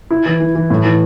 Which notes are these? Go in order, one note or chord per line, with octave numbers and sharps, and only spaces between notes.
E4
E3
E3
E3
A2
E3